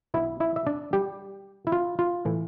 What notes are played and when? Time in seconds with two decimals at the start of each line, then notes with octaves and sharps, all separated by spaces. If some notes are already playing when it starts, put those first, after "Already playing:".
0.14 B1 B2 B3 D4 E4 E5
0.40 E4 E5
0.56 E5
0.66 D4 D5
0.93 G3 G4
1.67 E4
1.72 F4
1.99 F4
2.25 A2 E3 A3